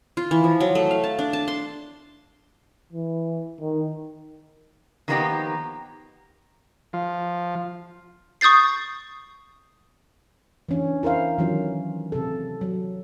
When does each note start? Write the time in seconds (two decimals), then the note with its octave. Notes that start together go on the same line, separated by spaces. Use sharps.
0.17 F4
0.31 E3
0.44 F3
0.60 F#3
0.75 A3
0.91 F5
1.04 A5
1.19 D4
1.33 A5
1.48 C6
2.92 E3
3.61 D#3
5.08 D#3 F3 A#3 B3 D#4 G4
6.93 F3
8.41 C#6 D#6 G6 A6 C7
10.69 E3 C#4 D4
11.03 E4 A#4 C5 F5
11.38 D#3 E3 F#3 C#4 F4
12.12 C3 A4
12.61 F#3